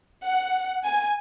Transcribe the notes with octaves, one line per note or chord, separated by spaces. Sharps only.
F#5
G#5